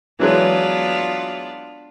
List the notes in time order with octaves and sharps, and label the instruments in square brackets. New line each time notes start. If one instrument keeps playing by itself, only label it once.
[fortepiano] E3 F#3 G#3 [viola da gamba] B3 D4 F4